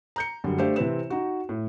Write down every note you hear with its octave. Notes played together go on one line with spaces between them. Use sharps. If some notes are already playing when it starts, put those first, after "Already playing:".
A#5 G6 C#7
F#2 D3 G3
A3 D4 G4 C5 F5
C3 E3 C4 B4 E7
D#4 F#4
A2